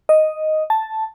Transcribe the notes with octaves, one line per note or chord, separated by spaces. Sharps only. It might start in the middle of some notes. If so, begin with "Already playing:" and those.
D#5
A5